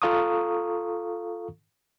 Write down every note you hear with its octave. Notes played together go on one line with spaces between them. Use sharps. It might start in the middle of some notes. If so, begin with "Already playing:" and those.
F4 A4 F5 A#5 C#6 D#6